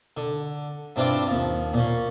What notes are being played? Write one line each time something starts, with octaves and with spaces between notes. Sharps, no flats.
D3
G2 C4 D4 E4 F4 D6
D#2 F3
A#2 C#4